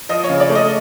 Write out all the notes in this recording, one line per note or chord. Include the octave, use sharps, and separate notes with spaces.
F3 D#5
C#5
C#3
D5
A3
D#5